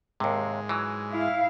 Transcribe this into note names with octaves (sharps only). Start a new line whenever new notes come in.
D#2 G#2 C3 G#3
E3 F#3
E4 F5